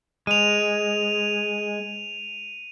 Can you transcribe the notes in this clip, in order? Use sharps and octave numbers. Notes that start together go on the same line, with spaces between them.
G#3 D#7 F7